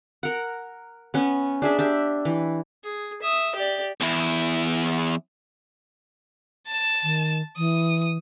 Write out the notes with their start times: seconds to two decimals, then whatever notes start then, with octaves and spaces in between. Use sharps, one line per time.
0.23 A#4 F#5
1.14 B3 C#4
1.62 D4 G#4 E5
1.79 D4 G4 E5
2.25 E3
2.84 G#4
3.22 E5 D#6
3.56 G4 D5
4.00 E2 E4
6.68 A5 E7
7.03 D#3
7.57 E3 D#6